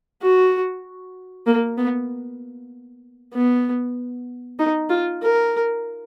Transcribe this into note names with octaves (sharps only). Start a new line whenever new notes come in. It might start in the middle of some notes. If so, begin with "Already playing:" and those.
F#4
A#3
B3
B3
D#4
F4
A#4